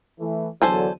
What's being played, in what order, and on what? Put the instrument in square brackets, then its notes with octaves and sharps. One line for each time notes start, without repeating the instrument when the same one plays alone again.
[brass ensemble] E3 A3
[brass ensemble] E2 D3 F#3 [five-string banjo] A4 C5 G#5